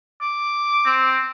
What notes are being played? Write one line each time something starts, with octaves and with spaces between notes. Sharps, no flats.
D6
C4